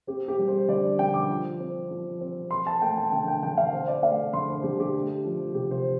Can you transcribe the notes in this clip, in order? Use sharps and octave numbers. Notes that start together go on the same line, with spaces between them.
C4 G4
G4
G3
C5
D3 D5
D3 G5
D6
F3
C4
F3
C4
C4 C6
A5
A3 G5
A5
D3 G5
G5
D3 G5
F5
C4 C5
D5
A3 F5
D3 C6
C5
D3 G4
G4
A3
F3
C3 G4
C5